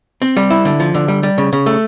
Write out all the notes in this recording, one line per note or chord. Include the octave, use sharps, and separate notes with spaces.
C4
G3
E4
D3
F3
D3
G3
G3
C#3
C#3
A3